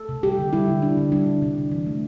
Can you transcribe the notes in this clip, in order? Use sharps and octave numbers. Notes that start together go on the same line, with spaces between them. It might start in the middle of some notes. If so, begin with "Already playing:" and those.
Already playing: A4
C3
G3 G4
D3
G3 E4
D3
G3 D4
D3
G3 D4
D3
C3
C3
E3
A3